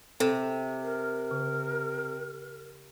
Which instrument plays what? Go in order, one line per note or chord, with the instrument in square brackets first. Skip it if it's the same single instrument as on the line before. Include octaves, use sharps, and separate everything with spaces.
[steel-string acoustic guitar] C3 [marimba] A4
[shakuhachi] A#4
[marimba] C#3